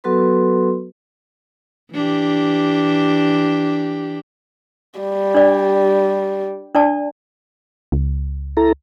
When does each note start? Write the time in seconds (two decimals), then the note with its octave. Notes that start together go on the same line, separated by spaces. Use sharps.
0.04 F#3 B3 F#4 A4 B4 C6
1.93 E3 D4 G4
5.00 G3
5.35 D4 D5
6.75 D4 D5 A5
7.92 C#2
8.57 E4 A4 A#5